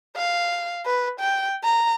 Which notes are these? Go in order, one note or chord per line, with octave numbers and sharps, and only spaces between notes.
F5
B4
G5
A#5